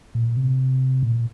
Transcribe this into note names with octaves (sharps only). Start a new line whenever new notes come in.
A#2
C3
A#2